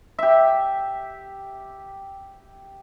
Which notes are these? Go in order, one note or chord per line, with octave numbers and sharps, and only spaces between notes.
G4 E5